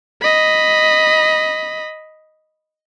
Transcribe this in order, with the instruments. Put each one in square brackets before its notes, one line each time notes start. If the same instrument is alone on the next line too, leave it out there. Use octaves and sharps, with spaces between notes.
[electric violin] D#5 B5